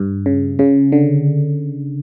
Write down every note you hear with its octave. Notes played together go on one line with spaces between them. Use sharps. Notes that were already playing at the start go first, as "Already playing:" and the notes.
Already playing: G2
C#3
C#3
D3